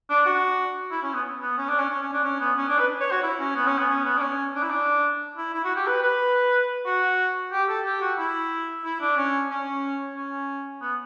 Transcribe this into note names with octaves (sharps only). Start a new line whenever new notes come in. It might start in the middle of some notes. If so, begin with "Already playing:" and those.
D4
F#4
E4
C#4
B3
B3
C#4
D4
C#4
C#4
C#4
D4
C#4
B3
C#4
D4
B4
C#5
F#4
E4
C#4
B3
C#4
B3
C#4
B3
D4
C#4
D4
E4
D4
E4
E4
F#4
G4
B4
B4
F#4
G4
A4
G4
F#4
E4
E4
D4
C#4
C#4
C#4
B3